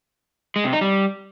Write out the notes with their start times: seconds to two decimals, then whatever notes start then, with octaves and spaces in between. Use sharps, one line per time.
0.56 G#3
0.64 C3
0.73 D#4
0.81 G3